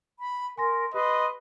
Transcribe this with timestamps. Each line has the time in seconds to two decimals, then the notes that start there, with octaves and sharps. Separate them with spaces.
0.19 B5
0.58 A#4 G#5 C6 A#6
0.94 G4 B4 D#5 C6